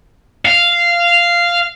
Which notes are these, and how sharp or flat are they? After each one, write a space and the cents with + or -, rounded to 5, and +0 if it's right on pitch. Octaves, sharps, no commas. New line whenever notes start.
F5 -10